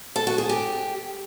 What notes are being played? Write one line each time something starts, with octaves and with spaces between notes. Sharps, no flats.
A4
F#4
G#4
G4